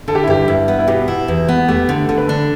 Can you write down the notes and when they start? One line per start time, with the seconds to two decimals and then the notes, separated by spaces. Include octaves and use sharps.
0.08 D3 A4
0.15 G4
0.23 E4
0.27 G2 G4
0.48 G2 E4
0.68 B3
0.79 E4
0.88 B2 G4
1.08 E4
1.28 E2
1.48 B3
1.68 A3 G4
1.89 D3
2.08 D3 A4
2.17 B4
2.27 D4 A4